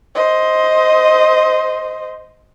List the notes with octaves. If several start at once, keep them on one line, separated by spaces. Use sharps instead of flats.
C5 D#5